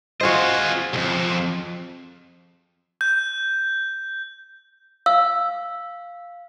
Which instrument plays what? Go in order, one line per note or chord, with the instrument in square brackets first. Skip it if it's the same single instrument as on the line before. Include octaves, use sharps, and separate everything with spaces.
[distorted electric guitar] F4 D#5 [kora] F#4 G#4 C5
[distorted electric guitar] C2 F2
[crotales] G6
[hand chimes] F5 [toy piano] E6